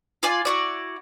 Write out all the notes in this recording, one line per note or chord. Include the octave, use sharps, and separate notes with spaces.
F4 D5 G#5
E4 F#4 D5